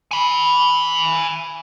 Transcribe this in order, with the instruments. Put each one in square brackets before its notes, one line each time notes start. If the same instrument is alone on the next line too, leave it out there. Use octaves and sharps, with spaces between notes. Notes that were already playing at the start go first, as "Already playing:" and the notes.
[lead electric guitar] G#5 B5